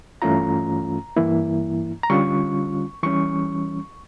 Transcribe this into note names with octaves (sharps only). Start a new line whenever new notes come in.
G2 E3 A3 C#4 F4 A#5
G2 E3 A#3 E4
A#5
D3 G3 C#4 F4 C#6
E3 G3 C#4 C#6